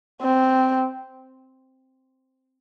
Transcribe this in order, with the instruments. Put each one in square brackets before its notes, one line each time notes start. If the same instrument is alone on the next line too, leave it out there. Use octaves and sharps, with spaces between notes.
[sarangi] C4